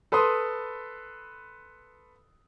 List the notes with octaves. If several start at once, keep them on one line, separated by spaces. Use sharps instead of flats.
A4 B4 B5 C6 D#6